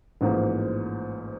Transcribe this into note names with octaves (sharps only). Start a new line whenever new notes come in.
A1 G#2 F3 A#3